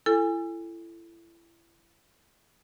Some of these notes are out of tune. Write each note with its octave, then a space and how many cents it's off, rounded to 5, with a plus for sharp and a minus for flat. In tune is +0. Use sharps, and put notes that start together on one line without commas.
E4 +30 A4 +5 G#5 -25